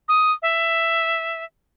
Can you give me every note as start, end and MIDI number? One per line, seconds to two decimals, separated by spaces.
0.09 0.32 87
0.42 1.44 76